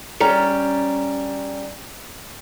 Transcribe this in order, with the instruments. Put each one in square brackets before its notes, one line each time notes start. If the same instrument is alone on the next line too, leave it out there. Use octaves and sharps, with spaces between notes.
[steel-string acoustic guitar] G3 C#4 A#5